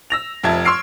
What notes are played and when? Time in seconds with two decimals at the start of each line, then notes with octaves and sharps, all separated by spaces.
0.10 E6 A#6 F7
0.43 F1 F2 E5 A5 G#6
0.65 C6 C#6 E6 F6 C7 D7